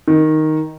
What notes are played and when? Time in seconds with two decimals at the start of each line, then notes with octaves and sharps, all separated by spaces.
0.08 D#3